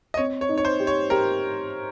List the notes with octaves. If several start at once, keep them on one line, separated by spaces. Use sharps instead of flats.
D#5
C4 C#5
C#5
D#4
C#5
C5
G4
C#5
G4 A#4